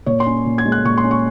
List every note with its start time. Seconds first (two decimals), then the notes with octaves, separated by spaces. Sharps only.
0.06 A#2 C#5
0.20 C6
0.26 C#4
0.46 A#2
0.58 G#6
0.65 G#3
0.72 F#6
0.85 A#2 C#6
0.98 C6
1.04 C#4
1.11 C#6